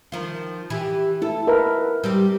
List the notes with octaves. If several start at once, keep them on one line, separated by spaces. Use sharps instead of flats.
D#3 F3 F4
E3 G4
E4 A4
A#4 B4 E5
G3 C4 G4